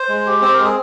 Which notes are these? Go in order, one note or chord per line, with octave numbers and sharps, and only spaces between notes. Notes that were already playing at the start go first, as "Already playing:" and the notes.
Already playing: C5
G#3
G4
C4 C5
A#4
G#3
G#4